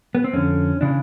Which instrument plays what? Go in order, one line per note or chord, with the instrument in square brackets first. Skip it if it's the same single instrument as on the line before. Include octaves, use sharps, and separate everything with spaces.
[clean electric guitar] B3
C4
F2 D3 C#4
C#3 E3 D4